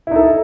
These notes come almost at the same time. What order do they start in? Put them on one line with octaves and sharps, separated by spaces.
E4 D#4 A4